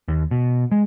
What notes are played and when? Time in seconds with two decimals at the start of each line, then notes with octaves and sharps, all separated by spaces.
0.08 D#2
0.31 B2
0.72 G#3